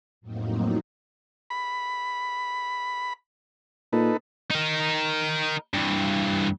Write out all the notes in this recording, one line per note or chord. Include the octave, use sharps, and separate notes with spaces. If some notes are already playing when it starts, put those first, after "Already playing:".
F2 A2 F#3 A#3 C4 D#4
B5
A#2 D#4 A4 B4
D#4 A#4
G2 E3